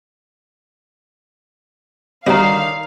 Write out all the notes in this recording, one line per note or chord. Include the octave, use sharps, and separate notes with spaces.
D3 D#3 G3 F#4 C#5 D5 F5 A#5